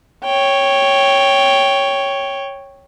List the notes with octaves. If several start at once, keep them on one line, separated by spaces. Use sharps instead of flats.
C#5 G5